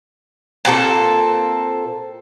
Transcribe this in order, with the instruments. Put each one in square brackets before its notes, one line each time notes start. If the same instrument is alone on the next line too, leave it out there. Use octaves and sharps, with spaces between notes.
[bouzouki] A#2 C4 F#4 A4